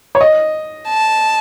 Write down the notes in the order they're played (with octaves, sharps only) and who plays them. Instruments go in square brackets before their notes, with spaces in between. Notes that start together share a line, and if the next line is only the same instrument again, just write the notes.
[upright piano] C#5
D#5
[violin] A5